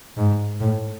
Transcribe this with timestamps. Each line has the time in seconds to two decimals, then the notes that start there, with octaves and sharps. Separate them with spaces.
0.17 G#2
0.61 A2